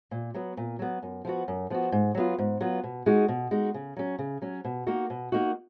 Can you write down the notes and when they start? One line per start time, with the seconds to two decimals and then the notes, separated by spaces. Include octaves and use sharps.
0.11 A#2
0.34 F#3 B3
0.57 A#2
0.79 F#3 B3
1.03 F#2
1.25 F3 B3 F#4
1.48 F#2
1.70 F3 B3 F#4
1.92 G#2
2.15 F#3 B3 F4
2.38 G#2
2.61 F#3 B3 F4
2.84 B2
3.06 G#3 D#4 F#4
3.28 B2
3.51 G#3 D#4 F#4
3.74 C#3
3.96 F#3 C#4
4.19 C#3
4.42 F#3 C#4
4.65 B2
4.87 A#3 D#4 F#4
5.10 B2
5.32 A#3 D#4 F#4